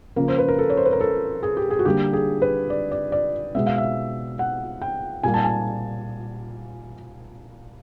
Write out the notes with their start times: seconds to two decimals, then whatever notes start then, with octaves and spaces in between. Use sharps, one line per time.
0.16 C#3 F3 A#3 A#4
0.28 C5
0.38 B4
0.48 A#4
0.59 A4
0.70 C#5
0.77 C5
0.85 B4
0.93 A#4
1.01 A4
1.43 G#4
1.57 G4
1.70 G#4
1.79 F#4
1.85 D3 G3 A#3 G4
2.13 G#4
2.42 B4
2.70 D5
2.91 D5
3.12 D5
3.55 B2 G#3 B3 E5
3.67 F5
3.78 E5
4.39 F#5
4.82 G5
5.23 A#2 G3 A#3 G#5
5.34 A5
5.44 G#5